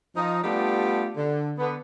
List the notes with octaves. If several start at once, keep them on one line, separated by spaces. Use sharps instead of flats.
F3 D#4
G3 A3 B3 D4 F4 G4
D3
D3 B3